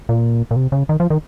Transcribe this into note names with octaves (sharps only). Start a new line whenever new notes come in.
A#2
A#2
C3
C#3
D#3
F3
D#3